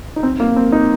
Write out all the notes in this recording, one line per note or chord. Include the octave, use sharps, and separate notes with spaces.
D#4
C4
A#3
C4
D#4